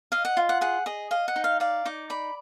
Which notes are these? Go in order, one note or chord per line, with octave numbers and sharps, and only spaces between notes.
D#5 F5
F#5
F4
F#5
G#4 F#5
G#4 D#5
D#5 F5
F#5
D#4
F5
D5 F5
D#4 D6
D5 B5